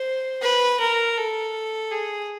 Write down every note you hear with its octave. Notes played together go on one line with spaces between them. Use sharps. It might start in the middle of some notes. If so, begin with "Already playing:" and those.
Already playing: C5
B4
A#4
A4
G#4